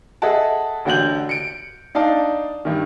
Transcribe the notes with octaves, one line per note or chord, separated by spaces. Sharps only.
G#4 A4 D#5 E5 F#5 A5
A1 D3 F#4 G6 F#7
C#7 D7
D4 D#4 D5 F5 A5
G2 D#3